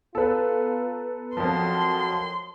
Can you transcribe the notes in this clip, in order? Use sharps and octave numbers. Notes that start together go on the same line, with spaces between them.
B3 F4 A4 B4 A#5
F2 F3 F#3 A#4 C6